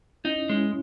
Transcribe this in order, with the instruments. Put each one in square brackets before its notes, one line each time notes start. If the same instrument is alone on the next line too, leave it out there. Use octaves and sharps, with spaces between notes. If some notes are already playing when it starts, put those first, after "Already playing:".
[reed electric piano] C#4 E4 [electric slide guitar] D#4
[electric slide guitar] G#3 [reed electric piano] C#4 E4